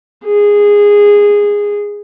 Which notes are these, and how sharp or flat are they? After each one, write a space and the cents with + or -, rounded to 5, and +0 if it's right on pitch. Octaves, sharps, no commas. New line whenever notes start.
G#4 -15